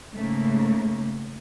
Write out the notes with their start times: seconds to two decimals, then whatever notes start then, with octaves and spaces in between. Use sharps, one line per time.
0.13 G#2 C#3 A3 A#3